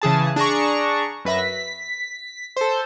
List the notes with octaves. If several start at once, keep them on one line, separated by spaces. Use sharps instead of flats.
C#3 E3 G#4 A5
D4 G#4 A#5 C#6
F#2 B4 E5 A#6
B6
A4 C5